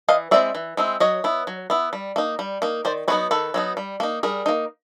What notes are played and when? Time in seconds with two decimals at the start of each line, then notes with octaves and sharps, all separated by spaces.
0.08 E3 D#5 F5
0.31 G#3 C4 E4 D5 E5
0.55 E3
0.77 G#3 C4 E4
1.00 F#3 C#5 D#5
1.24 B3 E4
1.47 F#3
1.70 B3 E4
1.93 G3
2.16 A#3 D#4
2.39 G3
2.62 A#3 D#4
2.85 D#3 C5 D5
3.08 F#3 B3 D#4 B4 C#5
3.31 D#3 A4 B4
3.54 F#3 B3 D#4
3.77 G3
4.00 A#3 D#4
4.23 G3 G#4 A#4
4.46 A#3 D#4